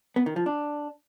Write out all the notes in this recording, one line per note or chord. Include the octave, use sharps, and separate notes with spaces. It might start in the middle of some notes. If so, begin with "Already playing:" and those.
B3
D#3
F3
D4